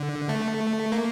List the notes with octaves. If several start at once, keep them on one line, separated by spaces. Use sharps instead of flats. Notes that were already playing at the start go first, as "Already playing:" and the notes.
Already playing: D3
A3
A#3